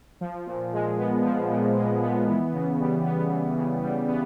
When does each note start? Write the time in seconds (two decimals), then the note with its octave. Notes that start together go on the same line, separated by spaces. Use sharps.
0.21 F3
0.47 A#2
0.73 G#3
0.98 B3
1.25 F3
1.51 A#2
1.76 G#3
2.02 B3
2.28 E3
2.53 C#3
2.80 G3
3.05 B3
3.31 E3
3.57 C#3
3.83 G3
4.09 B3